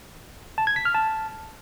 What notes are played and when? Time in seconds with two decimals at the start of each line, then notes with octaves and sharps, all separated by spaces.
0.58 A5
0.67 G#6
0.76 B6
0.85 F6
0.95 A5